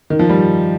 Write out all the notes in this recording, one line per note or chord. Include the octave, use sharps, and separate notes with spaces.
D#3
F3
G3